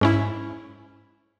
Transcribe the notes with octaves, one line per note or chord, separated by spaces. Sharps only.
G#2 C#4 E4